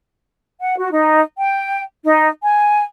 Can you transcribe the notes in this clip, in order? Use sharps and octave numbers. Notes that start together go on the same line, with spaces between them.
F#5
F#4
D#4
G5
D#4
G#5